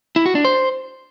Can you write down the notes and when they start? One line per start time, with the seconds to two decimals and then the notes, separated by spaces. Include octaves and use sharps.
0.16 E4
0.26 F#4
0.35 D4
0.45 C5